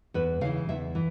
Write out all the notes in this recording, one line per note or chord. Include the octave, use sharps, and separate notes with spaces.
E2 B4
C#3 E3 F5
E2 E5
E3